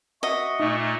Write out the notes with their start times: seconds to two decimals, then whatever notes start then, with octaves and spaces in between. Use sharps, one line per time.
0.23 F#4 D#5 E5 C#6
0.60 A#2 A3 D#4